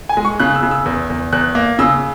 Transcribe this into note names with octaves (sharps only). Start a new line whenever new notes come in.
G#5
G#3
C#6
C#3 F#6
E6
C#3
E6
E2
E2
E2 F#6
A#3
C#3 E6